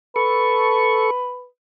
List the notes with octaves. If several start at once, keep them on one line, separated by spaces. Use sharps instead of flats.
A4 B4 C#6